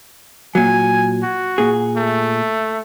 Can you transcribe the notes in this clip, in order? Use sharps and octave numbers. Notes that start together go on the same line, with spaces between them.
A#2 F#3 G#5
F#4
A#2 G#4
A3